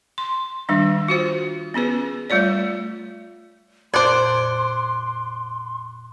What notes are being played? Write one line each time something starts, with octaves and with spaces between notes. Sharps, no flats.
C6
D#3 G3 D4
F4 F#4 C5
B3 C#4 G#4 B4
G3 A3 F4 C#5 D5
F2 A#2 C5 D5 C6 D6 F#6 D7